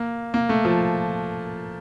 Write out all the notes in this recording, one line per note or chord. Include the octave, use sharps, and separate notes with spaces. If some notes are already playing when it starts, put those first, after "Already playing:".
Already playing: A#3
A#3
A3
F3